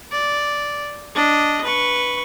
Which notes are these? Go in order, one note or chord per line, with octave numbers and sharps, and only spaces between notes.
D5
D4 D#5
B4 C#6